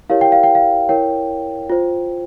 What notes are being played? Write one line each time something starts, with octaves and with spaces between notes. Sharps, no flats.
E4 G4 A#4 C#5 F5
G5
F5
G5
F5
E4 A#4 C#5 G5
F4 C5